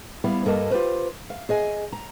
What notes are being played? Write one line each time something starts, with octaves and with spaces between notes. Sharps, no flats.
G3 B3 E4 F5
G2 A#3 A4 A#4 D#5 A5
F4 G4 A4 B4 C5
F5
G#4 D#5 G#5
A#5